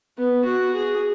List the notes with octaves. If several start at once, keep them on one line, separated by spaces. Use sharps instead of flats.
B3
F#4
G#4